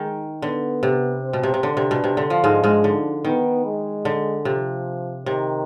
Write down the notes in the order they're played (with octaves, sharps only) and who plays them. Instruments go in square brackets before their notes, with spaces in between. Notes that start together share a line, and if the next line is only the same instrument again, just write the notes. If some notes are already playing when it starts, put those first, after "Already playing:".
Already playing: [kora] D#3 [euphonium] G#3
[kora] D3 [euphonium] B3
[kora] C3
[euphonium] C4
[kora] B2
C3
C3
[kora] D3 [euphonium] D4
[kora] C3
B2
C3
D3
F3
[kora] G#2 G#3 [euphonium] D4
[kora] G#2 G#3
D3
[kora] D#3 [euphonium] B3
[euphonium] G#3
[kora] D3
[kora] C3 [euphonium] F3
[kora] C3 [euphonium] D#3